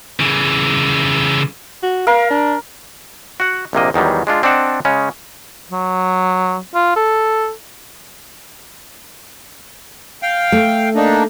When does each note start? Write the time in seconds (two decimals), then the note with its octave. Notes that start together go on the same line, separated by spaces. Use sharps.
0.20 C#3 E3
1.83 F#4
2.07 A#4 F5
2.30 D4
3.40 F#4 F#5
3.73 A#1 C3 A#3 D#5
3.94 E2 D#3 F#3 G3
4.27 G#3 D4 F4
4.43 C4 D4 D5 D#5 F#5 A5
4.85 C#3 G#3 C#4
5.71 F#3
6.75 F4
6.96 A4
10.23 F5 G5
10.52 A3
10.95 A#3 D4 D#4